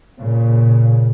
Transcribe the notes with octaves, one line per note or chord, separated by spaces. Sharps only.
A#2 C#3